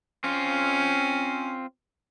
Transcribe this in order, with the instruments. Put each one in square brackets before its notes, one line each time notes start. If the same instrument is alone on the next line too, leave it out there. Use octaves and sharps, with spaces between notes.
[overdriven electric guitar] C4 F4 [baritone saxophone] C#4